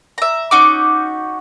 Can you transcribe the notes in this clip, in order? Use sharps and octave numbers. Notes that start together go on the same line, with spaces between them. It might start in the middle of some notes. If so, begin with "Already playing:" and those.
E5 A#5
C#4 D#4 F#4 D6